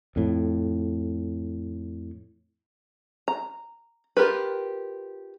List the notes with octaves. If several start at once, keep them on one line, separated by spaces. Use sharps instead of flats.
F2 A2
A#5
F4 G4 A#4 B4